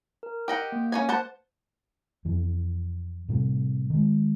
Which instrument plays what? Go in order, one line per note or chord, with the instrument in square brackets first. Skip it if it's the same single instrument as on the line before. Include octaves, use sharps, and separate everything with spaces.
[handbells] A#4
[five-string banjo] G4 D#5 F#5 [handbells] G5 G6
[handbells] A#3
[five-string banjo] C#4 D#4 G#5
C5 F#5 A5
[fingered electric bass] F2 E3
A2 C3 G3
D#3 G#3